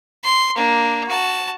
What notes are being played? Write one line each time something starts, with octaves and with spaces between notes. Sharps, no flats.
C6
A#3 D4
F#4 A5